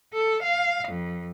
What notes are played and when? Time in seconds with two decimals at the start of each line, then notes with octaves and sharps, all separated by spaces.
0.13 A4
0.42 F5
0.88 F2